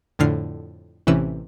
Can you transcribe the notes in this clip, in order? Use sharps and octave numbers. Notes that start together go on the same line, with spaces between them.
F2 A2 D3 F6 C7
A1 C3 E3 C#4 B4 E6